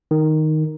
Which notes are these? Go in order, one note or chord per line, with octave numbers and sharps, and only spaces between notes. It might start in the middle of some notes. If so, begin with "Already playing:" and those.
D#3